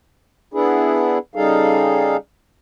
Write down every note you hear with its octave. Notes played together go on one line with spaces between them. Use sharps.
B3 D4 E4 G#4
C#3 G3 D#4 G#4 A4 F5